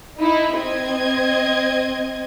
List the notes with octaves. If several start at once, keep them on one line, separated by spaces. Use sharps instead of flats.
D#4 E4
C4 D#5 G#6